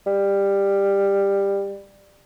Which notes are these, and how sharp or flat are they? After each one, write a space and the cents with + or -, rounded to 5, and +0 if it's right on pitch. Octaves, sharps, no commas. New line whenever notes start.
G3 +15